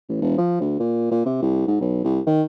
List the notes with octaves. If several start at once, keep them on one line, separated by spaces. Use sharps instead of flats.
A1
E1
F3
D2
A#2
A#2
C3
C2
G#2
B1
C2
D#3